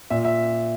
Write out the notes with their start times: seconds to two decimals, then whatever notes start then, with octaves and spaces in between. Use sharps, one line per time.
0.10 A#2 E5
0.25 E5